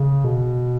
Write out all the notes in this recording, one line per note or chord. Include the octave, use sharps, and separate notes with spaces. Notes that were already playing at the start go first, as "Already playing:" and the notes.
Already playing: C#3
B2